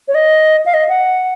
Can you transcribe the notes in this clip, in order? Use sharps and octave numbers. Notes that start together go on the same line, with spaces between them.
C#5
D#5
F5
D#5
F#5